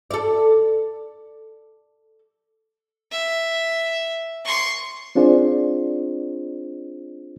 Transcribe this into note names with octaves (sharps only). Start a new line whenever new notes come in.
A4 D5
E5
C6 C#6
C4 D4 F4 G#4 C5 D5